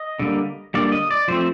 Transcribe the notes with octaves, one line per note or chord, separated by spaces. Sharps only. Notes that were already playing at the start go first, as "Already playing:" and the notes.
Already playing: D#5
D3 G3 A#3
D3 G3 A#3 D5
D#5
D5
F3 A3 C4 C5